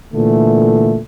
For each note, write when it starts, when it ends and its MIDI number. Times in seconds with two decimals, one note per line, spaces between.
0.13 0.98 46
0.13 0.98 50
0.13 0.98 52
0.13 0.98 57